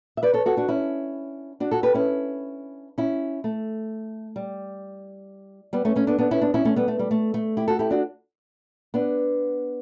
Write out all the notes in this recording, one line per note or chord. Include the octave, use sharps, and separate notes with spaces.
E5
B4 D5
A4 C#5
F#4 A4
D4 F#4
C#4 E4
D4 F#4
F#4 A4
G4 B4
C#4 E4
C#4 E4
A3
G3
G3 B3
A3 C#4
A3 C#4
B3 D4
B3 D4
C#4 E4
B3 D4
C#4 E4
A3 C#4
G3 B3
A3
G3
A3
A3
E4 G4
F#4 A4
E4 G4
D4 F#4
B3 D4